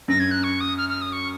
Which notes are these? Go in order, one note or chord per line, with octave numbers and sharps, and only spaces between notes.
F#2 A#6
G#6
F#6
C#6
D#6
F6
F6
D#6
C#6